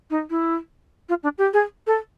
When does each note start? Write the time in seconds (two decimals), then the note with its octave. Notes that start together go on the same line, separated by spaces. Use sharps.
0.10 D#4
0.30 E4
1.09 F4
1.23 D4
1.38 G4
1.53 G#4
1.87 A4